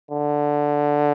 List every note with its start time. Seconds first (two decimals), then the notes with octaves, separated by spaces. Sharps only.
0.11 D3